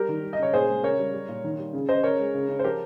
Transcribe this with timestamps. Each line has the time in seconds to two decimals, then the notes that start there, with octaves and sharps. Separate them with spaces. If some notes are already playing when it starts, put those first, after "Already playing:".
Already playing: G3 G4 A#4
0.09 D#3
0.23 G3
0.33 D#5
0.39 C#3 C#5
0.53 A#2 G#4 C5
0.69 G#3
0.83 C#3 A#4 C#5
0.99 G3
1.14 G3
1.29 A#2
1.44 D#3
1.59 G3
1.73 C#3
1.89 C#3 C5 D#5
2.03 C#3 A#4 C#5
2.19 G#3
2.34 C#3
2.49 C#3
2.59 C5
2.64 F3 G4 A#4